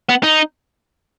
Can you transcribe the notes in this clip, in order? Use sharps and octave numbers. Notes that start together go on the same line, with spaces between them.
B3
D#4